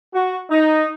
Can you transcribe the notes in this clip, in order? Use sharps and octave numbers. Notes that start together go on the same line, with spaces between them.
F#4
D#4